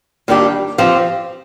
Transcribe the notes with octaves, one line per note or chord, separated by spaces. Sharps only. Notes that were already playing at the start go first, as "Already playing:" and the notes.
D#2 D#3 G3 D4 G4
F3 C4 G4